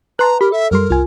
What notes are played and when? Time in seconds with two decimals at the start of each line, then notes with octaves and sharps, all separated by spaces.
0.19 B4 A5 A#5 C6 F#6
0.41 G4 A#4 B5
0.52 A4 E5
0.71 F#2 G3 A#4 C6
0.90 C2 F4 G#5